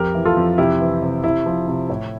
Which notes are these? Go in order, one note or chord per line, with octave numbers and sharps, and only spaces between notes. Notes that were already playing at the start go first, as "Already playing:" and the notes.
Already playing: F2 G4 A#4
E3
F4 A4
F2
C3 E4 G4
E3
C3
C3 E4
F3
C3
A2